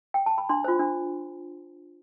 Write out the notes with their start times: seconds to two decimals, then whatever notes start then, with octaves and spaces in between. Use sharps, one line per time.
0.14 G5
0.26 A5
0.38 B5
0.49 D4 C6
0.64 F4 C5
0.80 D4